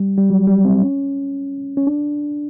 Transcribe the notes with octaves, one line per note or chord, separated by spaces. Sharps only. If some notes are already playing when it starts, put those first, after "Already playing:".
Already playing: G3
G3
F#3
G3
C4
C#4
C#4
D4